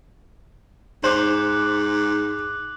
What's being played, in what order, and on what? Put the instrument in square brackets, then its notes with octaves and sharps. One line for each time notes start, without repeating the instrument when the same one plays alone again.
[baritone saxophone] G#2 [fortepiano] C5 [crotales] D6 F#6 F#7